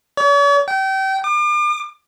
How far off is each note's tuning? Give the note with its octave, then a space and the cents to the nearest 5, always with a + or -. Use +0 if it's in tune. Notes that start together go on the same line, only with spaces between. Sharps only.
C#5 +45
G5 -30
D6 +40